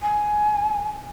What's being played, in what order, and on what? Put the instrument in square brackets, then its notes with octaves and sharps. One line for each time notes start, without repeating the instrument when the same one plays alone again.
[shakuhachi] G#5